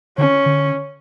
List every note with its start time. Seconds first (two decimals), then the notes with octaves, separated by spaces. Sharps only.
0.18 D3 C#4
0.46 D3